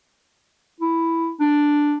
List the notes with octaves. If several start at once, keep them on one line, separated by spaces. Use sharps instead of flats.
E4
D4